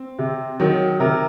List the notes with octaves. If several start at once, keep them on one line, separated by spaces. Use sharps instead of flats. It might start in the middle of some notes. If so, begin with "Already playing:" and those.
Already playing: C4
C3
D#3 F#3
C3 A#4